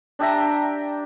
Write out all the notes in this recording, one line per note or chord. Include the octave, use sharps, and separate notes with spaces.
D4 G4 E5 A#5